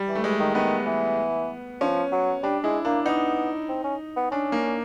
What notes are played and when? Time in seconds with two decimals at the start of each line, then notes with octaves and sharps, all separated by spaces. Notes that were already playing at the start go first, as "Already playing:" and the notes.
Already playing: G3
0.08 E3
0.15 A3
0.23 E3 G#3
0.39 D#3
0.54 D#3 B3
0.86 E3
1.81 F3 C#4
2.12 F#3
2.43 G3 D4
2.64 G#3 E4
2.85 A#3 D4
3.05 B3 D#4
3.69 C4
3.84 C#4
4.16 B3
4.31 C#4 D4
4.52 A#3